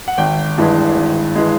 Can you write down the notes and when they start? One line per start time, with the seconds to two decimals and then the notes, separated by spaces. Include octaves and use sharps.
0.08 F#5
0.18 G#1 G5
0.58 G2 E3 G#3
0.96 G#1
1.35 E3 G#3